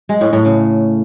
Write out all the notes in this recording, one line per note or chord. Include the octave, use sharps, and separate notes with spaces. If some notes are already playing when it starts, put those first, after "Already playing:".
G#3
A2
A2
C#3